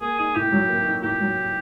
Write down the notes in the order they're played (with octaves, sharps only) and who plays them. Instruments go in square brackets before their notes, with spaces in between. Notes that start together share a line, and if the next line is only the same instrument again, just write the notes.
[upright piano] A#3 [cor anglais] G#4
[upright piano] D#4 [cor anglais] G#4
[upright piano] A2 [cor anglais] G4
[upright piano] F#3
A#3
D#4
[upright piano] A2 [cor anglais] G4
[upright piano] F#3
A#3